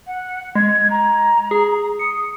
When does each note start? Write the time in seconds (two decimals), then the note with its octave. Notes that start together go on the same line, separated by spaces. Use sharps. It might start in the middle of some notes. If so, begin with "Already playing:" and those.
0.06 F#5
0.55 G#3 G#6
0.90 A#5
1.51 G#4
1.99 D#6 C#7